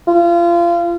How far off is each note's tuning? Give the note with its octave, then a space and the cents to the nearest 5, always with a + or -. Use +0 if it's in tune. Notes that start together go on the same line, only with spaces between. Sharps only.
F4 -30